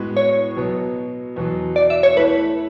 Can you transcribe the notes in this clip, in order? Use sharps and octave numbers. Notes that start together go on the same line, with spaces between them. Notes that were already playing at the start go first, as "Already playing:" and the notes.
Already playing: A2 G#3 B3 F#4 B4
C#5
B2 F#3 B3
E2 B2 F#3
D5
E5
C#5
E3 A3 E4 B4